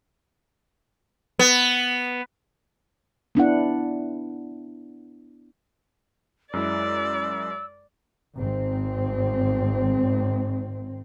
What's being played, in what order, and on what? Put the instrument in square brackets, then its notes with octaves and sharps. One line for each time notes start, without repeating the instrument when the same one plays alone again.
[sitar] B3
[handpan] B3 D4 E4 F#5
[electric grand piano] F#2 G#3 E4 [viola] D5 [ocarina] E6
[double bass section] G#1 C4